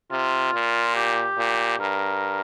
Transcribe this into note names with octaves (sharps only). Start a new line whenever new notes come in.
C3 F4
A#2
G4
A#2
G2 A#4